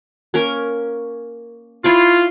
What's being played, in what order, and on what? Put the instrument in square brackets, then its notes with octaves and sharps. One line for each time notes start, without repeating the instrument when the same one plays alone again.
[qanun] A#3 C#4 A#4
[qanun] E4 C#5 D5 [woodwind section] F4